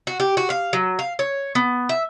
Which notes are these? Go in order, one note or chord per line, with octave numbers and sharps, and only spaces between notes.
F#4
G4
F#4
F5
F#3
F5
C#5
B3
E5